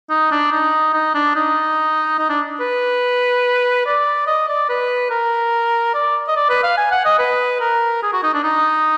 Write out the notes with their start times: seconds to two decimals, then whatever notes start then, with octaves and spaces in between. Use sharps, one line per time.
0.10 D#4
0.31 D4
0.52 D#4
0.93 D#4
1.15 D4
1.35 D#4
2.18 D#4
2.29 D4
2.60 B4
3.86 D5
4.27 D#5
4.48 D5
4.69 B4
5.10 A#4
5.94 D5
6.28 D#5
6.36 D5
6.49 B4
6.63 F5
6.77 G#5
6.91 F#5
7.05 D#5
7.19 B4
7.60 A#4
8.03 G#4
8.13 F#4
8.23 D#4
8.34 D4
8.44 D#4